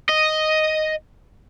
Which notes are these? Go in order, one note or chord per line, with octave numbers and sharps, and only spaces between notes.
D#5